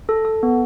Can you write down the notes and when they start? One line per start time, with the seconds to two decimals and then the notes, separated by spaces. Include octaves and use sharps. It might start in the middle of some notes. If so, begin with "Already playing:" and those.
0.09 A4
0.25 A4
0.43 B3